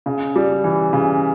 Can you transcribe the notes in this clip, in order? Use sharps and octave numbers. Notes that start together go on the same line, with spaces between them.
C#3
G3
E3
C#3